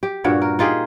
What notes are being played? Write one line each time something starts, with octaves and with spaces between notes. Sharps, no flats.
G4
G2 A#2 F#4 C#5
A#4
D#4 F4 G4 G#4